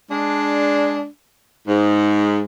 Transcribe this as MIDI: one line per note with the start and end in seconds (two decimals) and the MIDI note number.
0.11 1.06 56
0.11 1.06 62
1.67 2.41 44